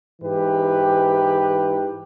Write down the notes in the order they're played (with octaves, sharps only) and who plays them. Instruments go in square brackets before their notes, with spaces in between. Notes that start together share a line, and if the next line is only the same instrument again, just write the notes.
[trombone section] G#2 E3 G4 B4